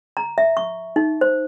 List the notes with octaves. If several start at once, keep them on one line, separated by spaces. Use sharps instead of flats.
A#5
E5
C#6
D#4
C5